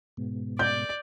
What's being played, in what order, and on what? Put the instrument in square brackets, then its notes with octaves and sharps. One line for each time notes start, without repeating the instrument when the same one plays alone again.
[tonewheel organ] G#2 B2
[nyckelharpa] D5 [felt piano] G6